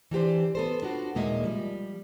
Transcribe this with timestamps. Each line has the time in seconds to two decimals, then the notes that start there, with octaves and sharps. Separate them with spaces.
0.11 E3 D4 G4 C5
0.55 B3 A4 C5
0.82 D4 F4 F#4
1.15 D#2 A#2 G#3 A#3 D#5 E5
1.44 F3 G3